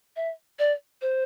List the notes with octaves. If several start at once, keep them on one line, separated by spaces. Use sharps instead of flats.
E5
D5
C5